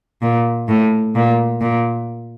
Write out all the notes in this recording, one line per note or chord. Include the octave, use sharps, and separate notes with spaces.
A#2
A2
A#2
A#2